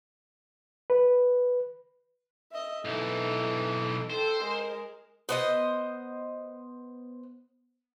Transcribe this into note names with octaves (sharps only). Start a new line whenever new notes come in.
B4
D#5 E5
B1 E3 D#4 A4
A4 C5 G5
G#3 A#4
B3 C5 D#5